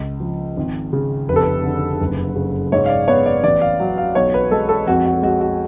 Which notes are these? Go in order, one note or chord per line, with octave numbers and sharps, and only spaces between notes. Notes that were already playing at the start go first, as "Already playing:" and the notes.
Already playing: C#2
F3
G#1
C#3
F1 B4
A4
B4
D3
F#1
C#3
G#2 C#5
F5
D5
B3 C#5
D5
A1 D5
F5
F#3
F5
B1 C#5
B4
G#3 A4
A4
F2 F#4
F#4
G#3 F#4
F#4